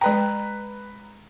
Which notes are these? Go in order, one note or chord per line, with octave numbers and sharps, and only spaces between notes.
G#3 B4 G5 A#5